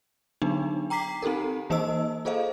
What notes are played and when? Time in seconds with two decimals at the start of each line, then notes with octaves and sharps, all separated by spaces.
0.42 D3 F#3 B3 D4 D#4
0.90 G5 A#5 D6 B6 C7
1.22 C4 D#4 G4 A4 A#4
1.70 E3 A#3 D#4 C5 D#5 E6
2.25 F4 G#4 A4 C5 D#5 F5